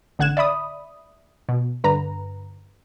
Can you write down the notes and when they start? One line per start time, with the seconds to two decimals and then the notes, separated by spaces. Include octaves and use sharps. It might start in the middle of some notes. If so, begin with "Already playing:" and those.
0.19 A1 D3 F#5 F#6 G#6 E7
0.37 D5 E5 B5 D#6
1.49 B2
1.84 G2 D3 B4 A#5